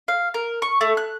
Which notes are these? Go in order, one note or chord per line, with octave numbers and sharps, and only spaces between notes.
F5
A#4
C#6
A3
F#6